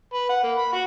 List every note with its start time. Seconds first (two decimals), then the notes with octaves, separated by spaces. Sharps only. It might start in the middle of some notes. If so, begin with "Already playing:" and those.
0.14 B4
0.29 F#5
0.43 A#3
0.57 B5
0.73 F#4